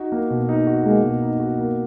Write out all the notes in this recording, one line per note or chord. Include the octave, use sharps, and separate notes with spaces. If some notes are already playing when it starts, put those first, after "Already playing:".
Already playing: D#4 F#4
A#3
B2
D#4
F#4
G#3 A#3
B2
D#4
F#4
A#3